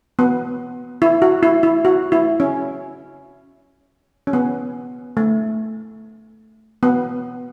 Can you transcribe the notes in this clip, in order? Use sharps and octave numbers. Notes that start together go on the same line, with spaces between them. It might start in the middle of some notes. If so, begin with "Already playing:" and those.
B3
E4
F#4
E4
E4
F#4
E4
C#4
C#4
B3
A3
B3